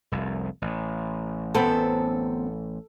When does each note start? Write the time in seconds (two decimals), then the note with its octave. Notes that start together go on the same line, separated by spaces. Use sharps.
0.12 F1 C2
0.62 A1
1.55 F#2 B3 C4 A4